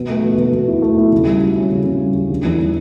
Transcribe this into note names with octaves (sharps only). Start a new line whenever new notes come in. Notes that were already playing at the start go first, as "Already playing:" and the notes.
Already playing: B2
A3
B2
B2
B2
E4
A3
E4
C#3
G3
F#4
C#4
C#3
C#3
G3
G3
D3
E2
D3